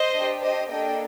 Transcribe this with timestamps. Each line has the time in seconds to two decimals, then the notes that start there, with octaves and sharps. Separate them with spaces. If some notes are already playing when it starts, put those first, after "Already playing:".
Already playing: C5 D#5
0.13 D4 G4
0.42 C5 D#5
0.70 A#3 D4 A4 D#5 G5